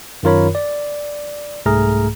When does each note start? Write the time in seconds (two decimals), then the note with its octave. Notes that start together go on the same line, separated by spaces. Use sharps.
0.23 F#2 D#3 F4 A#4 C#5 B5
0.55 D5
1.66 C2 G#2 A3 G#4 A#5 F6